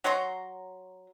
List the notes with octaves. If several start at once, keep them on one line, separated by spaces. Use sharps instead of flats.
F#3 C#5 A#5 C6